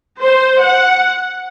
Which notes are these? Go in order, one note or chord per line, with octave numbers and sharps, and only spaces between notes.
C5
F#5